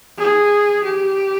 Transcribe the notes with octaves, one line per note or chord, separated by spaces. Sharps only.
G#4
G4